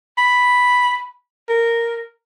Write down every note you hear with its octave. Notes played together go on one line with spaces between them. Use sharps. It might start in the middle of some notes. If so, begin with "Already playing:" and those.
B5
A#4